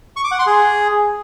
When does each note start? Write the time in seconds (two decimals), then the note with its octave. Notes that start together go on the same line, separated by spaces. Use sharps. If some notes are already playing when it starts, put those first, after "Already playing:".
0.16 C#6
0.24 D6
0.31 F#5
0.39 C6
0.46 G#4